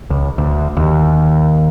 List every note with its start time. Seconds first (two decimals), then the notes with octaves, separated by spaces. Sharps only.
0.10 C#2
0.38 D2
0.77 D#2